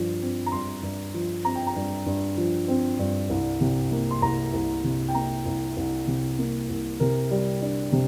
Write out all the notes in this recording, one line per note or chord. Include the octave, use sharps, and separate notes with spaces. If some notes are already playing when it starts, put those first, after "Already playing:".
Already playing: G2 F3
C4
A#5
G2 C6
G2
F3
C4 A#5
G5
A#5
G2
G2
F3
C4
G2
C2
C3
A#3
C6
C2 A#5
C2
C3
G5
A#3 A#5
C2
C2
C3
A#3
C2
C3 A#4
G3
D4
C3